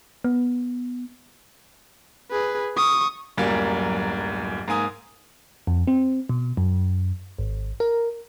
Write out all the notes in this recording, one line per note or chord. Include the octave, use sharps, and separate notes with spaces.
B3
G#4 B4
C#6 D#6
D1 F#2 G3 A#3
G#2 A#3 G#5 D#6
F2
C4
B2
F#2
G#1
A#4